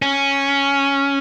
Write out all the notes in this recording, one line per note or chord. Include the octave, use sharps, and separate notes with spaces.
C#4